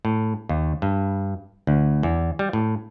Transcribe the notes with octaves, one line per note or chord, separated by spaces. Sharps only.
A2
D#2
G2
D2
E2
G3
A2